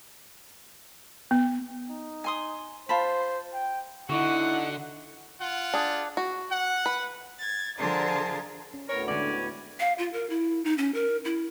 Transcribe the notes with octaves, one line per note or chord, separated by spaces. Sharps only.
B3
D#4
G#5 C6 D#6
F4 C5 A5 B5
G5
D3 D#4 E4 F#4 F#5
F4 F#5
D4 G#4
F#4
F#5
B4
G#6 A6
D3 F3 F4 G#4 A#4 A5
C#4
D2 A2 B3 A#4 C#5
D3 G#3 C#4 D5 F#5
F5
F4
A#4
E4
D#4
C#4
A#4
E4